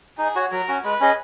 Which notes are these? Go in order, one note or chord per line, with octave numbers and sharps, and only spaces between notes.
D#4 G#4
F#4 C#5
F#3 A#4
C#4 F#4
G#3 B4
C#4 G#4 D#5